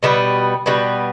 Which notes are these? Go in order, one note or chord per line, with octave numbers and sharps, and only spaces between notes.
B2 G3 B3
B2 G3 B3